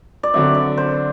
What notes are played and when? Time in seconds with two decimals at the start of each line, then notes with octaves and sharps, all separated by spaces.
0.23 D5
0.34 D3 F#3 C4 E5
0.55 D5
0.77 C5